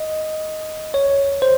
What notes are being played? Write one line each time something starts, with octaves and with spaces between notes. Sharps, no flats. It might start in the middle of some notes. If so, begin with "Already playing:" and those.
Already playing: D#5
C#5
C5